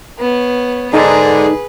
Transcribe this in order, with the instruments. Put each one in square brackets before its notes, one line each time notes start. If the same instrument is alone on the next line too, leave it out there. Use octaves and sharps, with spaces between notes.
[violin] B3 C#5
[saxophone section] G#2 D3 [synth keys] D#4 [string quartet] G#4 [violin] B4